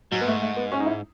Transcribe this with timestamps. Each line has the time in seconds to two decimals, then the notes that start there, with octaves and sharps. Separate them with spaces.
0.11 G#2 F#3
0.21 B3
0.27 A3
0.41 A3
0.57 B3
0.72 C#4
0.80 D#4
0.86 E4